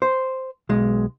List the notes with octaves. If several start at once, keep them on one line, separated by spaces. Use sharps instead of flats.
C5
B1 G#3